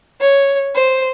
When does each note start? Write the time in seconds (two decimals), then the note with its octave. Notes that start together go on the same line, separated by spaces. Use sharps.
0.19 C#5
0.74 C5